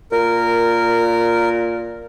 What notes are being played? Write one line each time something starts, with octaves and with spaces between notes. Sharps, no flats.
A#2 A#4